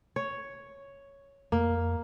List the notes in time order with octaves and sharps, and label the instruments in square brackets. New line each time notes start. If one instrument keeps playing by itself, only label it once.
[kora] C#5
[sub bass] F2 [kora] A#3